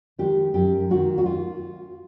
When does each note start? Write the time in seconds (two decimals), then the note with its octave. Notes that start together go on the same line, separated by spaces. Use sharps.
0.18 D#3 G#3 G4
0.54 F#2 G4
0.90 D#3 G#3 F#4
1.18 F#4
1.26 F4